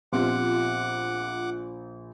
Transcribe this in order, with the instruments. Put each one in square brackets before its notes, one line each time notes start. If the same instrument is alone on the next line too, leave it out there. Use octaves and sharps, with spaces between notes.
[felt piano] A#1 [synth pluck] B3 C4 G4 [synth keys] F4 [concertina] F#5 D6